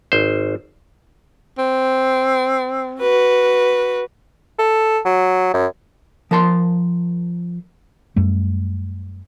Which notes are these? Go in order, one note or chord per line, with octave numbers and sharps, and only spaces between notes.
G#1 C5
C4
F#4 B4
A4
F#3
F#2
F3 A#4 A5 C6
F#2 G3 A3